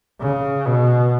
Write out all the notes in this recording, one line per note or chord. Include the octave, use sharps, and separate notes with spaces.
C#3
B2